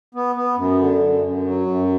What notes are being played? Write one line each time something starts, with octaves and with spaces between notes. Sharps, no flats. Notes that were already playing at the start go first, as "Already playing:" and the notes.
B3
B3
F#2
D3
F#2
F#2
F#3
F#2